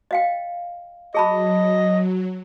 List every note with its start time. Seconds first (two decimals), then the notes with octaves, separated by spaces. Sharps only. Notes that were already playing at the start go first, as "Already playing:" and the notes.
0.11 D#5 F5 G5
1.14 F#3 G#4 D#5 A5 B5